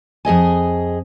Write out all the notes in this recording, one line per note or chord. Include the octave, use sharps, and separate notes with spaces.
F2 G#4 D#5 G#5